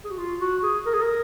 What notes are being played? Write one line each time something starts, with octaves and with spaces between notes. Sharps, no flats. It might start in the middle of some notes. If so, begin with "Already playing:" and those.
G#4
F#4
F4
F#4
G#4
A#4
G#4
A#4